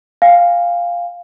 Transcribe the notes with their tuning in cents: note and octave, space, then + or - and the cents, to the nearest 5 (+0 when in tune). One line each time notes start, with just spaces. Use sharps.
F5 +0 G#5 -25